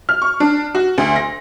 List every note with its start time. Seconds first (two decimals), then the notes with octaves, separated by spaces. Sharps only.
0.09 F6
0.22 C#6
0.40 D4
0.75 F#4
0.98 D2
1.16 A#6